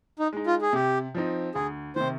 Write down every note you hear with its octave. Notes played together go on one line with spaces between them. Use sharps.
D#4
G#3 D#4
F4
G#4
C3 G4
F3 C4 D#4
D2 G#4
C3 D#3 C5